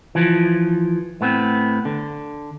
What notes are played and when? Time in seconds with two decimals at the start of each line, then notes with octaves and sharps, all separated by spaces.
0.15 E3 F3
1.21 A2 B3 C4
1.85 D3